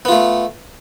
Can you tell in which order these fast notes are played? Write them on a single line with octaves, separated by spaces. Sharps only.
B3 F4 A3